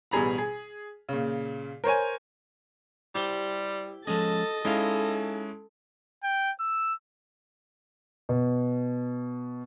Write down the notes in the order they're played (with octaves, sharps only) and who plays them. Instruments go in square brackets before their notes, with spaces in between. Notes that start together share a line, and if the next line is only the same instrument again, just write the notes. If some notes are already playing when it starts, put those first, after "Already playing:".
[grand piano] A1 B2 G3 G#4 A#5 B5
G#4
A#2 C#3
A#4 C5 C#5 G#5
[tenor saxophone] G3 [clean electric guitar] E4 G4 C5
[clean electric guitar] F3 G#3 C#4 [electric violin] A4 A6 [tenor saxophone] D#5
[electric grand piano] G#3 C#4 E4 [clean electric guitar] D#4 F5 [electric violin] A4
[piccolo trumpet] G5
E6
[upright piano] B2